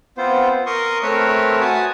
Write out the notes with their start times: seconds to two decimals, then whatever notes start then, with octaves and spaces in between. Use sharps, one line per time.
0.18 B3 C4 F4 C5
0.66 A#4 C6 C#6 D#6
1.03 A3 C4 A#4 B4 C#5 E5
1.61 F#4 G#5 A5 D#6